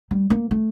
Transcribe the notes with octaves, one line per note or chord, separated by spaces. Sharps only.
G3
A#3
A3